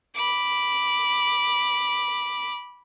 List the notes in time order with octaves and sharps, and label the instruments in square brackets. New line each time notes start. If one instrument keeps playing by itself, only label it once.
[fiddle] B5 D6